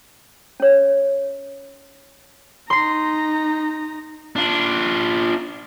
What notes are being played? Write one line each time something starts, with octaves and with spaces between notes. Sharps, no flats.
C#4 C#5
D#4 A#5 C6 C7
D4 F4